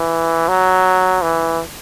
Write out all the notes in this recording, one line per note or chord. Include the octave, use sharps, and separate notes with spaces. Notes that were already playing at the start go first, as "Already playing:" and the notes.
Already playing: E3
F#3
E3